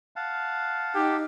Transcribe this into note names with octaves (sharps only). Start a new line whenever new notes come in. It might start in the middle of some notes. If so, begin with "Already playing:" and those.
F5 F#5 A5
D#4 G4